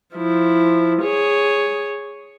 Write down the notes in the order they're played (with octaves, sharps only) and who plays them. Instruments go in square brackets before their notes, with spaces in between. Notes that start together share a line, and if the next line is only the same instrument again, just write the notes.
[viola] F3 E4
G#4 C#5